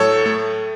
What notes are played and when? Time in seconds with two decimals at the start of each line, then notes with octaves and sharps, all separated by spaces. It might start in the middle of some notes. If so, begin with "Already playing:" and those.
Already playing: A2 F#3 A4 C#5
0.26 A3